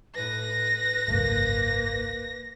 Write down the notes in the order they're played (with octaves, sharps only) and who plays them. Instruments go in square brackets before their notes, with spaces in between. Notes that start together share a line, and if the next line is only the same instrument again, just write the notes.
[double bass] A2 [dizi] B4 [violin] A#6
[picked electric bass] G#1 C#2 F#2 [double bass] A#3